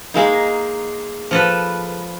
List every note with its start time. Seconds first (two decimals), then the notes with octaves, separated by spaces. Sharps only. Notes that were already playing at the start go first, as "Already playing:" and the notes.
0.14 G#3 A#3 D#4
1.31 F3 A4 B4